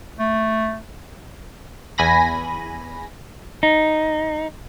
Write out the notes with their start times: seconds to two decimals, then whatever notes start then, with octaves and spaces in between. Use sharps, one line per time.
0.19 A3
1.98 E2 G#5 B5 A#6
3.63 D#4